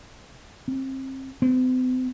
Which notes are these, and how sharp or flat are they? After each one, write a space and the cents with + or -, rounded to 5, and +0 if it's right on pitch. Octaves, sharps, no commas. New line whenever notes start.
C4 +30
C4 -45